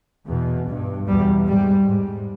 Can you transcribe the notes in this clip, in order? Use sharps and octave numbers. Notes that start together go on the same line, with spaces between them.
E2 B2
G2
E2 B2 G3
G#2 G3
G#2